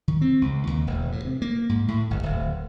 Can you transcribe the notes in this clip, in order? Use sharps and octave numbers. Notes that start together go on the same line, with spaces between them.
D#3
C4
C#2
D#2
E1
A2
C3
A#3
G#2
A2
G1
D1